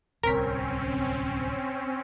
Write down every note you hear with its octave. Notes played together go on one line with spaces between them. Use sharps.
D1 C2 C4 C#4 A#4 B6